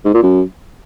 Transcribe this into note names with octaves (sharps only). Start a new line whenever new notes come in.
G#2
A#2
F#2